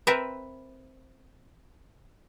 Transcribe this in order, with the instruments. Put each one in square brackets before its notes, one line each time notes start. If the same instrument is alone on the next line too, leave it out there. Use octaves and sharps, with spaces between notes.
[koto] C4 A#4 B4 E5